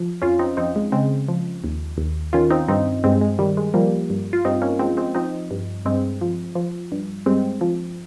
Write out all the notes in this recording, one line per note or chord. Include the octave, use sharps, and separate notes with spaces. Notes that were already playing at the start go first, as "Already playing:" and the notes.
Already playing: F3
F2 C#4 F4
C4 D#4
F2 C4 D#4
G#3
C#3 G#3 C4
F3
D#2
D#2
D#3 C#4 F4
C4 D#4
G2 C4 D#4
G2 G#3 C4
G#3
D#3 G3
G#3
F3 G3 A#3
G2
F4
G2 C4 D#4
A#3 C#4
F3 G#3 C4
G#3 C4
F3 C4 D#4
G2
G2 G#3 C4
F3
F3
G2
G2 G#3 C4
F3